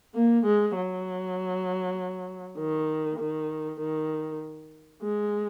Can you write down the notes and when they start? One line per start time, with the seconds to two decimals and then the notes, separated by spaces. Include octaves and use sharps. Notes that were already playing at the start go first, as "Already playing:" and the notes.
0.15 A#3
0.46 G#3
0.76 F#3
2.58 D#3
3.19 D#3
3.80 D#3
5.02 G#3